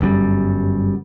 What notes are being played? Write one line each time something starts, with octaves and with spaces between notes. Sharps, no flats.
G1 F#2 C#3 G3